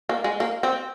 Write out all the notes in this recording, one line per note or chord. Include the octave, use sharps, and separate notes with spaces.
A#3
G#3
A#3
C4